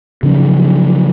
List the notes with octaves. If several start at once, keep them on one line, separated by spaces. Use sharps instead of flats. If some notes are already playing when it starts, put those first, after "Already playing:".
C#3 F3 F#3 C#4